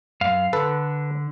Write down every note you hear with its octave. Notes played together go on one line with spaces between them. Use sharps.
F#2 F5
D3 A4 B4